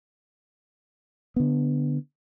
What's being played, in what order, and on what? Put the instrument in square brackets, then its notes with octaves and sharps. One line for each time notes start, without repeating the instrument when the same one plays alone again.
[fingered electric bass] D3 B3